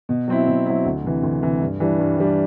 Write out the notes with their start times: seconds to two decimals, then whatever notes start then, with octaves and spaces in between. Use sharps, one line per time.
0.09 B2
0.28 F#3 C4 E4
0.47 B2
0.66 F#3 C4 E4
0.85 D2
1.04 C3 E3
1.23 D2
1.42 C3 E3
1.61 G2
1.80 E3 G3 D4
1.99 G2
2.18 E3 G3 D4